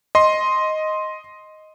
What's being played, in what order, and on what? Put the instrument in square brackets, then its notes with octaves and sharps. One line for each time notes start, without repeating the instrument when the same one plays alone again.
[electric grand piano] D#5 C6